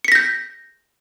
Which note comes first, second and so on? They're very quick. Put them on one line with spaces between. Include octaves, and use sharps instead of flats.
C#7 B6 A#6 G6